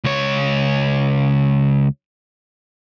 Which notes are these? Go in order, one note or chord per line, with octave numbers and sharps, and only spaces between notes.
C#2 C#5